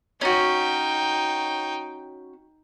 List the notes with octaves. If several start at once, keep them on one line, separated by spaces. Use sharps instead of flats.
C#4 D#4 F#4 G5